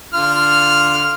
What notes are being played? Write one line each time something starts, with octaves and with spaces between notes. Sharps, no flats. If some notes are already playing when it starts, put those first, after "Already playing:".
D3 F4 F6